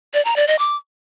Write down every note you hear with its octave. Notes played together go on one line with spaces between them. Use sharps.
D5
A#5
D5
D#5
D6